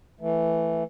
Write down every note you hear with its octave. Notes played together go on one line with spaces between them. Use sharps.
E3 A3